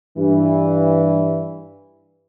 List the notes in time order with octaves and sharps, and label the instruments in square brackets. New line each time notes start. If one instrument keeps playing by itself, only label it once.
[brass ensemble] G2 E3